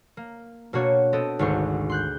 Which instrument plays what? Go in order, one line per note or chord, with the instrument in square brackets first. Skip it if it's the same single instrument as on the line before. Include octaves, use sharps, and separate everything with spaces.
[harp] A#3
B2 A#3 D4 F#4 C#5
B3 C4 A4 D#5
G#1 D2 C5 C#6
C6 F#6 G6